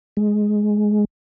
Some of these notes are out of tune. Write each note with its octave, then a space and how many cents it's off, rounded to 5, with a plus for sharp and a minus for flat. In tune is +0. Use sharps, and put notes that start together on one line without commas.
G#3 +10